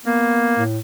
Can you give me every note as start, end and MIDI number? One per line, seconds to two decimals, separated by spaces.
0.06 0.63 58
0.06 0.55 59
0.58 0.78 45